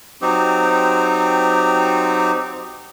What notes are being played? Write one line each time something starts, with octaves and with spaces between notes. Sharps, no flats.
F#3 C4 D#4 G4